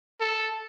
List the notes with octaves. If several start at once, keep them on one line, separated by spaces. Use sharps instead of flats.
A4